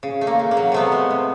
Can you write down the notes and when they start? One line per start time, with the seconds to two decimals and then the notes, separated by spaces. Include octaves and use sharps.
0.03 C#3
0.21 A3
0.27 A#3
0.39 C#3
0.51 A#3
0.57 F#3
0.72 C3 A3 B3
0.92 G#3
1.10 C3